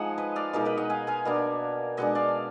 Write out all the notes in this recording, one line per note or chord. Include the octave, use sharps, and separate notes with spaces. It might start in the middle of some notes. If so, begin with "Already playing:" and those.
Already playing: F3 G#3 D#4 F#5 G#5
B4 D#5
D5 F5
B2 G#3 D#4 A#4 D5
B4 D#5
D#5 F#5
F5 G#5
F5 G#5
B2 A#3 D4
B2 G#3 D4 D#5 F#5
D5 F5